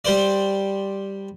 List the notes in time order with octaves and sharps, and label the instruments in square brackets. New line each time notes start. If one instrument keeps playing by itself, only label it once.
[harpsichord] G3 C5 D5